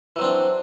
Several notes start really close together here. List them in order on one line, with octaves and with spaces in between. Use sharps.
E3 F#3 C4 D4